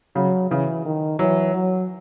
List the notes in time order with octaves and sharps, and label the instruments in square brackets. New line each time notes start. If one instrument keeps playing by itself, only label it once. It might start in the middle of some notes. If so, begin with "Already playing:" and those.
[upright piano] C#3 [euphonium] F#3
[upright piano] C#3 [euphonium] E3
[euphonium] D#3
[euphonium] E3 [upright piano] F#3
[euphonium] F#3